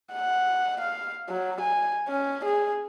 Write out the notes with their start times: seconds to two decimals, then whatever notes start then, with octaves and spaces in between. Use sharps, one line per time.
0.13 F#5
0.81 F5
1.29 F#3
1.61 G#5
2.08 C#4
2.45 G#4